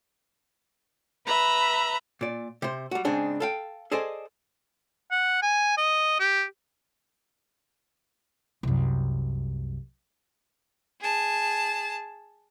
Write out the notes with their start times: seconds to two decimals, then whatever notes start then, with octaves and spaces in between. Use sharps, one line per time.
1.25 B4 E5 A#5 B5
2.21 A#2 D5
2.62 C3 C5
2.91 G3 F#4
3.05 G#2 C#3 C4 D4 G#4
3.40 A4 F5 G5
3.91 G#4 A4 C5 D5 D#5 G#5
5.11 F#5
5.43 G#5
5.78 D#5
6.20 G4
8.63 C2 F#2
11.01 G#4 A5